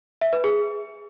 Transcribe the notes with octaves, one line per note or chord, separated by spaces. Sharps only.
E5
B4
G#4